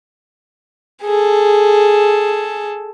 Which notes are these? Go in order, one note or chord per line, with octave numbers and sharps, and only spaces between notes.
G#4 A4